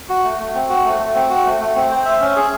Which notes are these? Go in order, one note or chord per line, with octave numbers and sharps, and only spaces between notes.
F#4
A3
A3
C4
F#4
A3
A3
C4
F#4
A3
A3
C4
C5
E5
C#4
G#4